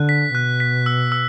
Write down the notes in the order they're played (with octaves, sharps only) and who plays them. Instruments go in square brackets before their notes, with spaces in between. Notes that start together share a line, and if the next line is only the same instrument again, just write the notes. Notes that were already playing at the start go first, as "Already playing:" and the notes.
Already playing: [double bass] D3 [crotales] F#6
[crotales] B6
[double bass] B2 [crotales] F#6
[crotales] B6
E6
E6